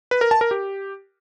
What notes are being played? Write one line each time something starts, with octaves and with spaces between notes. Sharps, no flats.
B4
A#4
A5
A#4
G4